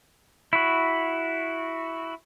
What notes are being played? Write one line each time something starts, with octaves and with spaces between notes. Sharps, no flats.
E4 F#4